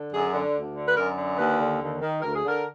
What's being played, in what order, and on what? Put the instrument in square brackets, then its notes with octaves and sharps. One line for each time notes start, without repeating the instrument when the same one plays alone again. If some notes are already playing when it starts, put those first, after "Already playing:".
Already playing: [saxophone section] D3
F#2 G#4
D3
D2
D3
B4
F#2 A#4
D3
D#2 B4
D3
D#2
D#3
D2 A#4
G#4
D3 A#4